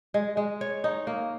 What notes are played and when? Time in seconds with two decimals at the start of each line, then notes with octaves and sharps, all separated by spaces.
0.14 G#3
0.37 G#3
0.61 C#5
0.84 D#4
1.07 A#3